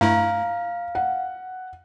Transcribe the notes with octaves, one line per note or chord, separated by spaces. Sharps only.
G2 A3 E4 F5 A#5
F#5